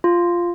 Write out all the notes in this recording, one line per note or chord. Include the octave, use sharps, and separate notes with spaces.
F4